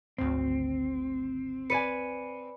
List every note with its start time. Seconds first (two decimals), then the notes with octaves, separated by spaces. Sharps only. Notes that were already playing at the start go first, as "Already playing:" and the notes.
0.18 G#1 D2 C4
1.70 B4 D5 G#5 C#7 D#7